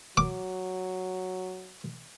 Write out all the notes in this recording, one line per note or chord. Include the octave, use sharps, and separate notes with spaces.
F#3 D6